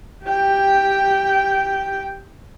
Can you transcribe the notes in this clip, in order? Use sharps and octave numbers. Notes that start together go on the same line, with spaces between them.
G4 G5